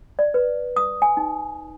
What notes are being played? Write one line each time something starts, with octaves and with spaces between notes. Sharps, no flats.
D5
B4
D#6
G#5
D#4